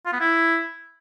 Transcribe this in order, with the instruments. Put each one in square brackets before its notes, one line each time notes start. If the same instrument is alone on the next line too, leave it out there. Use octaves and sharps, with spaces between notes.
[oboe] F4
B3
E4